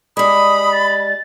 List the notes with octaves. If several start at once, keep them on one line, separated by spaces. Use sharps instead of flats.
G3 G#3 B5 D#6
A6